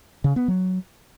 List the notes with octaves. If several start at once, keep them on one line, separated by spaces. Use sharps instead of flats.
C#3
B3
F#3